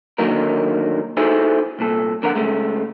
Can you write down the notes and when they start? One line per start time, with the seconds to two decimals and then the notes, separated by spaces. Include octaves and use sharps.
0.18 D3 D#3 F#3 A#3 D#4 A#4
1.17 D#4 E4 F#4 G#4 A4 C5
1.79 C2 A#2 A4
2.22 F2 D3 A#4 C5 F#5
2.35 C#3 G#3 A3